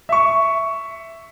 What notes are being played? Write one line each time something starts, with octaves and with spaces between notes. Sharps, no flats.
E5 C#6